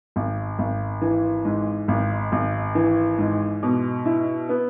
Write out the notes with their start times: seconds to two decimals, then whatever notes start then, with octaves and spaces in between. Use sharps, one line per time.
0.16 G#1
0.59 G#1
1.02 E3
1.45 G#2
1.88 G#1
2.32 G#1
2.75 E3
3.19 G#2
3.63 B2
4.06 E4
4.49 B3